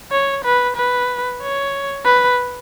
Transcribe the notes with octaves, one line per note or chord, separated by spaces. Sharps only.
C#5
B4
B4
C#5
B4